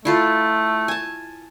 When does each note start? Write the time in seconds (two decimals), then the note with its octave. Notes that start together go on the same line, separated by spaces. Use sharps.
0.05 A3 E4 F4 A4
0.88 G#5 A5